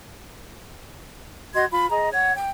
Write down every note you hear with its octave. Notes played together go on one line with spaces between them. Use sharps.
F#4 D#5 C6 G#6
F4 B5
G#4 D#5 A#5
C#5 F#5
G5